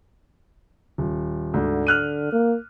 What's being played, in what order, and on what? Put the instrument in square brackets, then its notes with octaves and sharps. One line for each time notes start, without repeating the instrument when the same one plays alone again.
[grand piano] D#1
[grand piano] D2 G#2 [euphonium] D3
[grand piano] F6 F#6 D#7
[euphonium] A#3